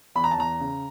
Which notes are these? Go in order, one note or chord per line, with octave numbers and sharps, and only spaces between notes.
E2 B5
A#5
A5
E2 A#5
C#3